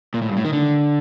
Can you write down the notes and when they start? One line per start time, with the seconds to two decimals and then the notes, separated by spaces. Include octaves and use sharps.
0.14 A#2
0.22 A2
0.29 G2
0.37 A2
0.45 D#3
0.53 D3